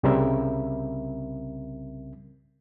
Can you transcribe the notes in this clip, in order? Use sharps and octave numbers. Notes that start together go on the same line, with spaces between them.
C2 C#3 G3 C4 A#4 E5